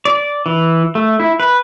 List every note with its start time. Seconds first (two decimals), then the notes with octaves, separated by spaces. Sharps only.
0.05 D5
0.46 E3
0.95 A3
1.20 E4
1.40 B4